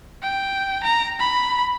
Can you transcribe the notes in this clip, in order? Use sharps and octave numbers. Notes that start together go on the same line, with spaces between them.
G5
A#5
B5